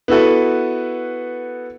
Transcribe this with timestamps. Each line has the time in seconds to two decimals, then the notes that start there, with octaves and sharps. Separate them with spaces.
0.08 B3 E4 F#4 A4 B4